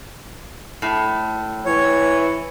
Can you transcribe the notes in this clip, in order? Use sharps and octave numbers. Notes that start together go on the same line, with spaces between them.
A2
E3 C#5